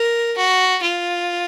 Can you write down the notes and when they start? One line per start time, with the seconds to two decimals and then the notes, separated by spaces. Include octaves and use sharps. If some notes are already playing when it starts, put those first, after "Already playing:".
Already playing: A#4
0.37 F#4
0.82 F4